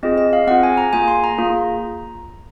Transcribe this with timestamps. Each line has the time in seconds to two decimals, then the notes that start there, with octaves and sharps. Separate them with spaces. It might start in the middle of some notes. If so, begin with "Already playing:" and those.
0.03 C4 F4 G#4 D#5
0.18 D#5
0.33 F5
0.47 C4 F4 G#4 F#5
0.63 G#5
0.78 A#5
0.93 A#3 F4 G#4 G#5
1.08 C6
1.24 A#5
1.38 A#3 F4 G#4